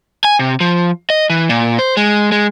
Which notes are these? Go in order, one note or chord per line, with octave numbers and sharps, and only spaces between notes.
G#5
C3
F3
D#5
E3
A#2
C5
G#3
G#3